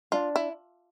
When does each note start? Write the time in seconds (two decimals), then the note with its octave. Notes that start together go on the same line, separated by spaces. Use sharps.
0.12 D4 F4
0.36 E4